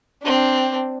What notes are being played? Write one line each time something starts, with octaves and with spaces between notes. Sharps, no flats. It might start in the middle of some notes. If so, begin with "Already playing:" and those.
C4 D4